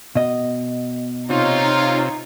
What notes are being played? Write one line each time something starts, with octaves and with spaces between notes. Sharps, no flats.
B2 D#5
C3 D#4 F4 C#5